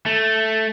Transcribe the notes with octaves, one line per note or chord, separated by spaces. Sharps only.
A3